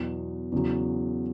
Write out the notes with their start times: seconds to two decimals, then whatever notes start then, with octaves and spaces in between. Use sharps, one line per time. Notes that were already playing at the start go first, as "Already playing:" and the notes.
Already playing: E2 B2 F#3
0.52 E2 C#3 F#3